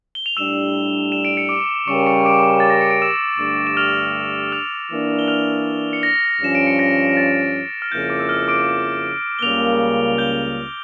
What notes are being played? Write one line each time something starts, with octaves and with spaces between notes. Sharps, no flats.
G7
F7
A2 G3 D4 G4 E6 E7
E7
D7
C#7
D6 D7
C#3 G3 C#4 G4 A#4 C#6 C#7
C#6 C#7
D6 D7
A6
A#6
C#7
D7
E6 E7
G2 D3 A3 D4 G4
E7
F6 F7
F6 F7
E3 A#3 D4
G7
F6 F7
C#7
A#6
G2 F3 C#4 E7
D7
C#7
A#6
A#6
A6
F6
F2 C#3 F3 A#3 E4 G6
D6
E6
F6
D6 D7
G7
C#2 C#3 G3 A#3 F6 F7
G6 G7